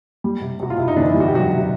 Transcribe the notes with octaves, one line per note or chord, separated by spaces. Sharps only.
G3
C3
C3 F#4
F4
C3 E4
D#4
D3 E3 D4
E3 E4
G3
F#4
G4
C3 F#3 F#4
C3